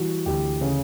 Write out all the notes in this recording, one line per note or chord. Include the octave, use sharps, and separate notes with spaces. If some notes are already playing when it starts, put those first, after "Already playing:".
Already playing: E3 G3 F#4
D2 G4
C#3